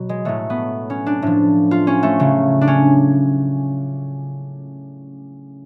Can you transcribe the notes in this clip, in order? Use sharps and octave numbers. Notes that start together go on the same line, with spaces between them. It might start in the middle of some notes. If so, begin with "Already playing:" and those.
Already playing: B2 F#3
G#3
A2 F#3 A3
B3
C#4
D4
A2 F3
F4
C#4
A3
C#3 F#3
D4
C#4